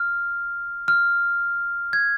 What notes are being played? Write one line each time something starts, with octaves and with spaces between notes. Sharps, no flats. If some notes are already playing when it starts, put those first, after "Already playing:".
Already playing: F6
F6
G#6